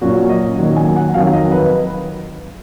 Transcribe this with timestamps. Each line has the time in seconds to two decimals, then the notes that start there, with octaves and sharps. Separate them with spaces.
0.01 A#2 F#3 C#4 F#4
0.29 D#5
0.58 D#3 F#3 A#3
0.76 G#5
0.96 F#5
1.14 F2 D#3 F#3 F5
1.33 D#5
1.52 B4